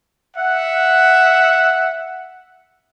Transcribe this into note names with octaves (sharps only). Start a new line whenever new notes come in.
E5 F#5